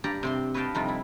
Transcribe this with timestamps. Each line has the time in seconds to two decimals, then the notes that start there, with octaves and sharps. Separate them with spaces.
0.04 G2 G4 D5 A#5
0.23 C3 C4 C6
0.54 B4 C#5 D#5 F5 G5 A5
0.75 F2 C3 G3 D#4 F4
0.88 E4